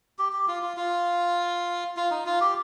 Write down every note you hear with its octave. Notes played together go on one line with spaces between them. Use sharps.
G4
G4
F4
F4
F4
F4
D#4
F4
G4